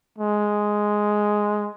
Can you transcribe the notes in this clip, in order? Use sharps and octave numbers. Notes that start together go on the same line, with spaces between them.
G#3